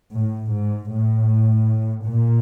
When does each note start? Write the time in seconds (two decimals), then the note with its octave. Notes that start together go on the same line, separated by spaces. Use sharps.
0.16 A2
0.54 G#2
0.93 A2
2.07 A#2